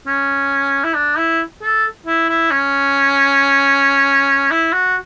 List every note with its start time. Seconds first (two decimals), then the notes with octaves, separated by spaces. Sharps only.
0.07 C#4
0.84 E4
0.96 D4
1.18 E4
1.62 A4
2.06 E4
2.29 E4
2.51 C#4
4.51 E4
4.73 F#4